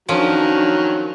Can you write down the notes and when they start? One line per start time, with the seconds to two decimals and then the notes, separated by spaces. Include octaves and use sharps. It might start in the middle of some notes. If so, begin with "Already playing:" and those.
0.09 D#3 F3 F#3 C#4 D4